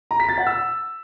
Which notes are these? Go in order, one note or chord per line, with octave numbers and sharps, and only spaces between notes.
A#5
B6
A6
F#5
E6